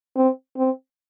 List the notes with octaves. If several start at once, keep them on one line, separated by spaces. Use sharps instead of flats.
C4
C4